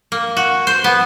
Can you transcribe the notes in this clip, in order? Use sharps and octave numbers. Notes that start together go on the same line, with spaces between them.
A#3
F#4
C5
B3